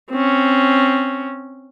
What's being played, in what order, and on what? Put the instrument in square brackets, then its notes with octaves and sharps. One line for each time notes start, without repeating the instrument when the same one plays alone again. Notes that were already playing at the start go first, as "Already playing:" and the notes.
[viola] C4 C#4